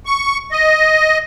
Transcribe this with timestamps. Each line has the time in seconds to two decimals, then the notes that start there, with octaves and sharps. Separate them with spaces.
0.06 C#6
0.52 D#5